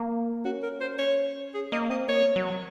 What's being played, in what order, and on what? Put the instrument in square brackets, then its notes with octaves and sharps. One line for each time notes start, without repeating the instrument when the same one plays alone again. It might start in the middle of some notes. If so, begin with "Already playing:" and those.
Already playing: [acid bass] A#3
[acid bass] C#4 [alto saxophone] F#4
[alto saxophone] A#4
C5
C#5
G#4
[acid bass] A#3 [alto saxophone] D#5
[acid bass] C4 [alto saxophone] D#5
[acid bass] A#3 [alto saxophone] C#5
[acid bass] F#3